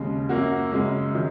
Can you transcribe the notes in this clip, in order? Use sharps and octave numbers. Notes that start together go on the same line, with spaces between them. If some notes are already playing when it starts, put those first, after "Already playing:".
Already playing: D#2 C#3 G#3
F#2 F#3 A#3 F#4
F#2 C#3 G#3
D#3 F#3